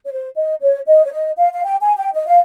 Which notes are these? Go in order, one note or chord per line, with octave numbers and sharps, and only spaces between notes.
C#5
C5
D#5
C#5
D#5
C#5
D#5
F5
F5
G5
G#5
G5
D#5
F5